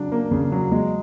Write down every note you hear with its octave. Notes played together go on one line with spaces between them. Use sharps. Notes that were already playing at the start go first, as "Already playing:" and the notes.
Already playing: C#3 F#3 D4
A#3
C#3
F#3
G#3